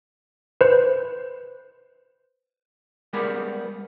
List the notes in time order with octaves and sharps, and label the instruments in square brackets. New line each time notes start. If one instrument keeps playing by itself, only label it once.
[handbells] B4 C5
[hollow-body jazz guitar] G3 G#3 B3 G4 A#4 B5